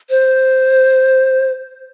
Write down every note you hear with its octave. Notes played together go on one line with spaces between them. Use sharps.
C5